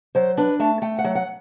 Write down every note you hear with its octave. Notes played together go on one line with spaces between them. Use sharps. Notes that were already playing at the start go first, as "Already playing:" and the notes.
F#3 C5
D4 B4
A3 A5
A3 G5
F#5
F#3
F#5